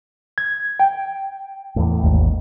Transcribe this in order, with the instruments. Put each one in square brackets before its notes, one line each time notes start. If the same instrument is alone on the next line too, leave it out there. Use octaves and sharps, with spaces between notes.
[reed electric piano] G#6
G5
[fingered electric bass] E2 A2
G#1 D#2 G#2